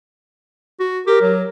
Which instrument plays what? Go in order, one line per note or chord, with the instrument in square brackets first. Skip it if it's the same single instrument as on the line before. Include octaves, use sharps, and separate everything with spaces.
[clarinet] F#4
[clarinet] G4 [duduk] A#4
[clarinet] F#3